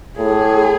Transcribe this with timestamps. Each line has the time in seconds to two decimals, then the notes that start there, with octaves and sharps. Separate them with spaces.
0.18 A2 G#4